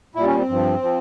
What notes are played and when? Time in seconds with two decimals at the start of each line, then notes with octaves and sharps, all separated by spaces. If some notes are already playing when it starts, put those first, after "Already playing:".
0.15 A#2 G3 E4
0.26 C#4
0.37 C4
0.49 G2 F3
0.82 F3